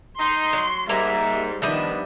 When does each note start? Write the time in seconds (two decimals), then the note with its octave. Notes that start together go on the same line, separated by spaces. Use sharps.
0.19 D#4 C6
0.53 F#3
0.89 G#2 G3 A#3 E5 A#5
1.62 D#3 F3 G3 B3 D4 D#5 E5